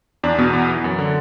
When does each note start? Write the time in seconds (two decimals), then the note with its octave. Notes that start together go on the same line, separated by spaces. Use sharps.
0.23 E2 D4
0.38 B2 B3
0.53 E2
0.69 E3
0.84 F#2
0.99 D3